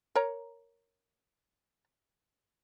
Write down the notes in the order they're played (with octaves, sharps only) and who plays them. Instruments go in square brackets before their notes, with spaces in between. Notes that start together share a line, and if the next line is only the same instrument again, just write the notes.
[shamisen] A#4 C#5 A#5